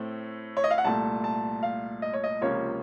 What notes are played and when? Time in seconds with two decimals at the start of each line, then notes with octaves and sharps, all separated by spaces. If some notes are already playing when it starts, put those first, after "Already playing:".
Already playing: A2 A3 C4
0.57 C#5
0.64 D#5
0.71 F5
0.78 F#5
0.84 C2 A#2 A3 A5
1.24 A5
1.63 F5
2.02 D#5
2.13 C#5
2.24 D#5
2.41 C#2 C3 F3 A#3 C#4 C#5